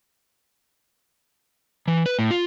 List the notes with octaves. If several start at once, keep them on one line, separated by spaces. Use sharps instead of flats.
E3
B4
A2
F4